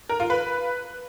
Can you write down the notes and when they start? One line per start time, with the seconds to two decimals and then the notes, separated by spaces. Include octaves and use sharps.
0.09 A#4
0.20 F4
0.30 B4